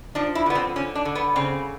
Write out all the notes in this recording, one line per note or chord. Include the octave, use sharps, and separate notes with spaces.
F3 D4
E4
D3 B3
C4
D3 C#4
D4
D3
B3
C#3 C4